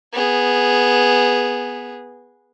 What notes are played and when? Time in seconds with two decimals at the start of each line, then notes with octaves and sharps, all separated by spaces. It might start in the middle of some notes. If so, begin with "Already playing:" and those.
0.13 B3 G#4